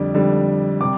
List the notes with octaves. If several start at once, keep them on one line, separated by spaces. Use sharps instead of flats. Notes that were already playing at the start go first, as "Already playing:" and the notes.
Already playing: F2 D3 G3 D4
F2 D3 G3 D4
C3 G3 D6